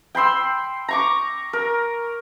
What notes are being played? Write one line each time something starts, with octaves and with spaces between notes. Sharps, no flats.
G5 B5 C6 E6
A#5 C#6 D6
A#4